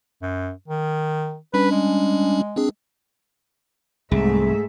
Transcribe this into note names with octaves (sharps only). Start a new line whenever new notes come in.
F#2
D#3
G3 C#4 D4 B4
G#3
C4 D4 G#4
C2 G#2 A3 G#4 E5